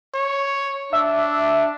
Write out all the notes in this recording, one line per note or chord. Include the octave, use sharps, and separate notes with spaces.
C#5
D4 E5